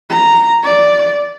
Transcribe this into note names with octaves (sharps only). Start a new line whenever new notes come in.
A#5
D5